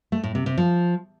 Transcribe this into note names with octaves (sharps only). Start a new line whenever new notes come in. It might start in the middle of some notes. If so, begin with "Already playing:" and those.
A3
A2
C3
C3
F3